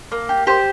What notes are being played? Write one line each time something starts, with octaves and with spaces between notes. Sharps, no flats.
A#3
G4
G4 C5